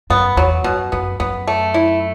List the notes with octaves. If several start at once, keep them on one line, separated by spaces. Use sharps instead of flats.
F#2 B3
E2 F#3
F#2 B2
F#2 B3
F#2 B3
A3
E4